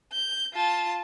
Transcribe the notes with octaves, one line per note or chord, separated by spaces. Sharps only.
G6
F4 A5